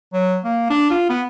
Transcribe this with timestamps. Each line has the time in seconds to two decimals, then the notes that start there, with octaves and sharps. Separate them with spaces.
0.13 F#3
0.45 A#3
0.70 D4
0.90 F4
1.10 B3